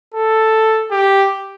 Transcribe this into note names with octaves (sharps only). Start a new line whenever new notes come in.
A4
G4